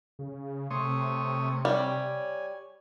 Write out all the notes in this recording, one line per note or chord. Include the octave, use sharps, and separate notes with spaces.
C#3
C3 A3 C#5 C6 D#6
G3 C#5 G#5